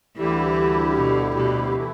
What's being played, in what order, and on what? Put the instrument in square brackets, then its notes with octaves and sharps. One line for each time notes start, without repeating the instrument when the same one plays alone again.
[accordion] D2 D3 G3 E4 G4 [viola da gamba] E3
[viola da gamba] B2
B2
[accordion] E3 A3 E4